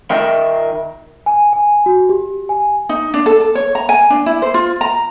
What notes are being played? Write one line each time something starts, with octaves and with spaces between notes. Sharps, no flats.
D#3 A#4 D#5 E5 G5
G#5
G#5
F#4
G4
G#5
D#4
D4
A4
A4
C#5
A#5
G#5
D4
E4
C5
F4
A#5